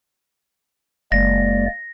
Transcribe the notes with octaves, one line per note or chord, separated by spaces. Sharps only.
F#1 G#3 A#3 D5 A#6